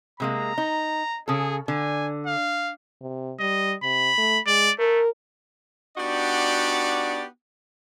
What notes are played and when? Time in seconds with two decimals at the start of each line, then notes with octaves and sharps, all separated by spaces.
0.20 C3 G#3 A#3 A#5
0.58 D#4
1.28 C#3 G#4 A4
1.68 D3 G#5
2.27 F5
3.01 C3
3.39 G3 D#5
3.83 C3 B5
4.18 A3
4.47 G#3 D5
4.79 A3 A#4
5.98 B3 D4 D#4 F#4 G4 D5